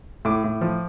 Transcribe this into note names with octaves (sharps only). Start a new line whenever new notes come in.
A2 D6
A2
F3